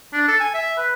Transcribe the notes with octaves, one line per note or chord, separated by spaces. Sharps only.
D4
A4
G#5
E5
B4